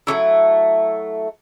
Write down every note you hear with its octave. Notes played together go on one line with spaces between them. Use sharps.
F#3 A3 C#4 E4